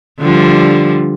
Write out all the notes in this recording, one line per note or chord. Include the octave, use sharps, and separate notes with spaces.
D3 F3 G3